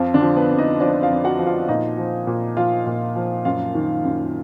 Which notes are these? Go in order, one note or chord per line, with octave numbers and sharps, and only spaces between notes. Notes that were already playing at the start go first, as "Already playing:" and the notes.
Already playing: F2 F3 F4
D3 D4
F3
B3 B4
F2
D#4 D#5
F3 D4 D5
F4 F5
F2
F#4 F#5
F3
F4 F5
A#2 D#4 D#5
F3
A#2
F3 F4 F5
A#2
F3
F#2 F4 F5
D#3
F#2